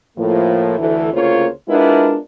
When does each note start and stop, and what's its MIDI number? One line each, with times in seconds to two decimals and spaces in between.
0.18 0.77 45
0.18 0.77 53
0.18 0.77 58
0.78 1.09 38
0.78 1.09 52
0.78 1.09 69
1.13 1.47 38
1.13 1.47 49
1.13 1.47 58
1.13 1.47 65
1.13 1.47 72
1.13 1.47 73
1.69 2.17 56
1.69 2.17 59
1.69 2.17 62
1.69 2.17 64
1.69 2.17 65
1.69 2.17 70